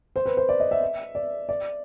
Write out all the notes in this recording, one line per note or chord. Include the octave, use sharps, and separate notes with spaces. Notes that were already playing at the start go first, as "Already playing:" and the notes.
C5
B4
C5
D5
D#5
E5
D5
D5